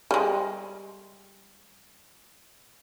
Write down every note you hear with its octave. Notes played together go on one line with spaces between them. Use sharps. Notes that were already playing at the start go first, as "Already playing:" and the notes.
G3 G#3